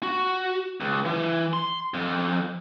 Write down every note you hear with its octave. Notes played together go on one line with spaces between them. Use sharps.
F#4
C#2
E3
C6
F2